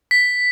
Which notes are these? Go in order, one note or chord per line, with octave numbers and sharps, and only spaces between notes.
B6